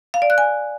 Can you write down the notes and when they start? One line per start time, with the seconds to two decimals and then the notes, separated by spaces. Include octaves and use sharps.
0.14 F5
0.22 D5
0.30 F#6
0.38 G#5